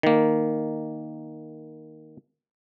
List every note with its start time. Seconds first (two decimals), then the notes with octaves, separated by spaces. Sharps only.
0.03 D#3 A#3